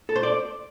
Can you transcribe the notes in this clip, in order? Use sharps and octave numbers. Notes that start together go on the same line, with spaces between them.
A4
C5
D5